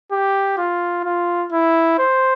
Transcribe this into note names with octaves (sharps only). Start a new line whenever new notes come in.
G4
F4
F4
E4
C5